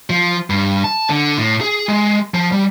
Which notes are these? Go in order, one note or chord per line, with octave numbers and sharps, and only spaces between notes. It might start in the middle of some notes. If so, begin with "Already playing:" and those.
F3
G2
A5
D3
A2
G#4
G#3
F3
G3